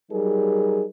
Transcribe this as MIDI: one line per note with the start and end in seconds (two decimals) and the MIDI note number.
0.11 0.84 54
0.11 0.84 55
0.11 0.84 63
0.11 0.84 68
0.11 0.84 70